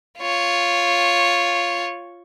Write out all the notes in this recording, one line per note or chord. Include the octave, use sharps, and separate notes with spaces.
F4 C#5